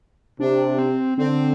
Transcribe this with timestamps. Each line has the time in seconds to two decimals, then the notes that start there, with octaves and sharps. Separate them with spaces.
0.39 C3 D4
0.79 C4
1.18 D3 C4